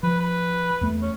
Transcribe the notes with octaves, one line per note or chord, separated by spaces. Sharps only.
F3 B4
B4
E2 A3
C#4